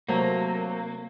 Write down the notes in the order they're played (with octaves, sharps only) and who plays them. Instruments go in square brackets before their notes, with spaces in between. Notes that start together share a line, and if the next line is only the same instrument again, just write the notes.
[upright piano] C3 F#3 A3 C4 [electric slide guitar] A#3